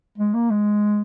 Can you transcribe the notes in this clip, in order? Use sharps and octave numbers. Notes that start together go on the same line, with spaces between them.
G#3
A#3
G#3